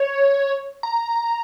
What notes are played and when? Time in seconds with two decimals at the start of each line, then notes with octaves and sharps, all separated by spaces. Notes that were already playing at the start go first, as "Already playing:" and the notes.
Already playing: C#5
0.83 A#5